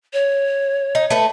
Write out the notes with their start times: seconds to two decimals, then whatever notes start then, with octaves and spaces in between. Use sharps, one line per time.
0.13 C#5
0.95 D#4
1.10 A3 B4